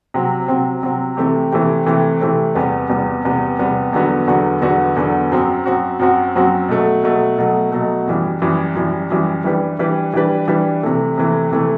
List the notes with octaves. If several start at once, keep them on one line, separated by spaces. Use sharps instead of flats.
C3 F#3 C4
C3 F#3 C4
C3 F#3 C4
C3 E3 A3 C4 G4
C3 E3 A3 C4 G4
C3 E3 A3 C4 G4
C3 E3 A3 C4 G4
E2 C3 G3 B3
E2 C3 G3 B3
E2 C3 G3 B3
E2 C3 G3 B3
E2 D3 F#3 B3 F#4
E2 D3 F#3 B3 F#4
E2 D3 F#3 B3 F#4
E2 D3 F#3 B3 F#4
F#2 F#3 C4 F#4
F#2 F#3 C4 F#4
F#2 F#3 C4 F#4
F#2 F#3 C4 F#4
B2 F#3 A3
B2 F#3 A3
B2 F#3 A3
B2 F#3 A3
F#2 E3 G3
F#2 E3 G3
F#2 E3 G3
F#2 E3 G3
E3 G3 D4 G4 B4
E3 G3 D4 G4 B4
E3 G3 D4 G4 B4
E3 G3 D4 G4 B4
C3 E3 A3
C3 E3 A3
C3 E3 A3